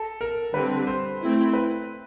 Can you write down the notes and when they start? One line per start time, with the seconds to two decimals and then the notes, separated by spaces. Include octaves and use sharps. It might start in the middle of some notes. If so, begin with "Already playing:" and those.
Already playing: A4
0.21 A#4
0.54 D3 G3 C4 B4
0.87 C5
1.20 A3 C4 E4
1.53 B4